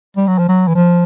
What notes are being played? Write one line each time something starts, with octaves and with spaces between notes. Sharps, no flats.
G3
F#3
F3
F#3
E3
F3